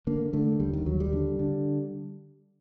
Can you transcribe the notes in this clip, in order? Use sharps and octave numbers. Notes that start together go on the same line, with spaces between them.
D3 A#3
D3 A3
D#2 G3
D#3
D#2 F#3
G3
D3
D3